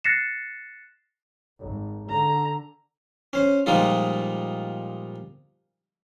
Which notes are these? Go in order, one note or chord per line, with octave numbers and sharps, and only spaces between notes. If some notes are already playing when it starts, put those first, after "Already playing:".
F#6 A6 A#6 C7 C#7 E7
G#1
D3 A#5
C#4 C5
A#2 F3 G3 G#3 D#4 F4